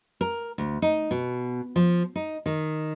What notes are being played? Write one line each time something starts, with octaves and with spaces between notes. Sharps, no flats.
A#4
D2
D#4
B2
F3
D#4
D#3